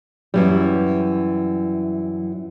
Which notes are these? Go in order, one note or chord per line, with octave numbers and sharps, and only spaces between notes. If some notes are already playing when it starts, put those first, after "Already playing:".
F#2 E3 F#3 G3